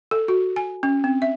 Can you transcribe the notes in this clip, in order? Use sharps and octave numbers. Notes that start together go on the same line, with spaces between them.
A4
F#4
G#5
C#4
C4
E5